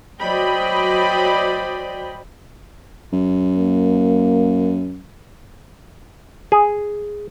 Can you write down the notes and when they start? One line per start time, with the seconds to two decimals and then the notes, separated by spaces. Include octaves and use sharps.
0.21 F#3 C5 D5 D#5 G5 B5
3.12 F#2
3.55 A#3
6.52 G#4